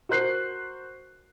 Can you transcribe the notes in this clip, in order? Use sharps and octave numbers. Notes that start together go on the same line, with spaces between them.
F#4 A#4 C5 F#6 C7